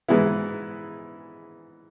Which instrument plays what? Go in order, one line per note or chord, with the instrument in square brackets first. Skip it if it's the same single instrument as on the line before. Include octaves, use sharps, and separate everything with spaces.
[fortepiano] G#2 E3 G#3 B3 E4